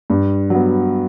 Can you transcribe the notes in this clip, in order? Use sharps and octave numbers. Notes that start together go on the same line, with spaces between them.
G2
F#3 B3